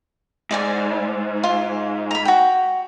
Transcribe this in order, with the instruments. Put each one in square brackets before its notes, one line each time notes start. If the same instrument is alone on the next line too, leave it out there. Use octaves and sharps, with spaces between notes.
[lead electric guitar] G#2 [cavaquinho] D#4 D5 G#5
[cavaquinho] F4
A#5 B5
F#4 G5